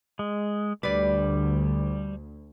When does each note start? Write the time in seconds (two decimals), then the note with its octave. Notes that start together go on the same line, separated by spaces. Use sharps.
0.19 G#3
0.83 D2 D3 G3 B4 D5